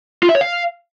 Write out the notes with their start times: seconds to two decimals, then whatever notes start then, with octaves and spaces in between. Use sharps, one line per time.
0.23 F4
0.29 E5
0.35 C#5
0.41 F5